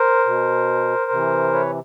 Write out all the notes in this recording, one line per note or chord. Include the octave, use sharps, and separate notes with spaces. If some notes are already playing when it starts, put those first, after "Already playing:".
Already playing: A#4 C5
B2
C3 E3
B4 C#5